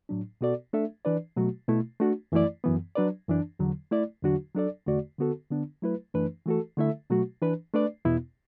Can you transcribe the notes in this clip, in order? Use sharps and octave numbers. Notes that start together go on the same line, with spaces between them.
A2 F#3 D4
B2 B3 F#4 A4 D5
A3 D4 A4 E5
E3 D4 B4 D5
B2 F#3 A3 F#4
B2 A3 E4
A3 D4 F#4
F#2 E3 A3 E4 D5
F#2 E3 B3
F#3 D4 B4 D5
F#2 E3 D4
E2 D3 F#3
A3 E4 D5
E2 D3 F#3 D4 F#4
F#3 D4 A4 D5
E2 D3 A3 F#4 D5
D3 B3 F#4 A4
D3 B3 D4
F#3 A3 E4 B4
F#2 E3 A3 D4 B4
E3 A3 F#4 A4
D3 A3 E4 A4 E5
B2 F#3 A3 F#4
E3 D4 B4
A3 D4 B4 D5
E2 B2 B3 E4